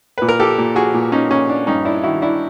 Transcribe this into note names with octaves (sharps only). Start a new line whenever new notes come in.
A#2 B4
A#4
G4 A4
A#2
F#4 G#4
A#2
C#4 D#4
A#2 C#4
D4
G2 C#4 D#4
D4 E4
D#3 E4 F#4
D4 E4